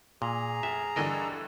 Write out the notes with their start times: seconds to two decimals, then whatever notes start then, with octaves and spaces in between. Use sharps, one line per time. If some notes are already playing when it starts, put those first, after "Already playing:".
0.22 A#2 G#4 A#5
0.63 F1 E5
0.96 G2 D3 E3 A#4 D#5